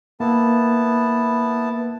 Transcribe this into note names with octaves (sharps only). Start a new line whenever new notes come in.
A#3 B3 E4 A5